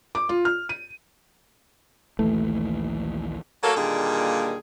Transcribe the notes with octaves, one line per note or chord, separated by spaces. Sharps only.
D6
F4
F6
D#7
A#1 D#2 E3 A3
F#3 A#3 A4
A#2 D3 D#3 G3 A#3 G#4